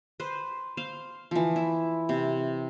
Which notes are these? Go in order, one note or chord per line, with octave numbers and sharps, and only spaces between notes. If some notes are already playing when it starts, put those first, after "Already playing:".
B4 C5
C5 F5
E3 F3
E4
C3